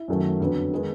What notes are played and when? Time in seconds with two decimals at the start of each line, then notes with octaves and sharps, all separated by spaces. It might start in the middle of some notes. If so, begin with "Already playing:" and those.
Already playing: E4
0.08 F#2 D#3 F#3 A3
0.40 F2 D3 F#3 B3
0.71 D#3 G#3 B3 D#4